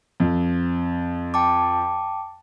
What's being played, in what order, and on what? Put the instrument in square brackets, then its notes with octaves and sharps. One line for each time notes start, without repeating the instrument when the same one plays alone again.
[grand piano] F2
[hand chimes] G5 A5 D6